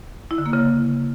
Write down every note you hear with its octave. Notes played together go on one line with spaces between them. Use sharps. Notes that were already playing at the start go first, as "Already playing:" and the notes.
E4
D3
A#3
C#3